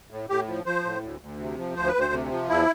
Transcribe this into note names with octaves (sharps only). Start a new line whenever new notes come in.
A2
A2 G4
F3
F3 C5
A2
D2
D2
C3
F3
D2 C5
B4
D2
C5
C3
F3
E2 E4